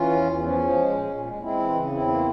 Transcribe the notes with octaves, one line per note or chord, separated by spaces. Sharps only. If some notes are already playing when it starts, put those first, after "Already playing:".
Already playing: E3 C#4 F4
E2
E2
F3 C#4
F3
G#3
A#2
A#2
G#3
G#3 C4 E4
E3
C#3
E2 C4 E4
A#3